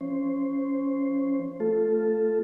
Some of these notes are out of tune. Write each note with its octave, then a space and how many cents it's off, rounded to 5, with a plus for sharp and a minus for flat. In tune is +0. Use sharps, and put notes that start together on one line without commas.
F3 -35 C#4 +0 C5 +0
A3 +0 F4 +0 A4 +0